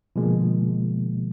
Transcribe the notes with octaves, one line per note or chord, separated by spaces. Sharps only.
B2 D3 F3 G#3 A#3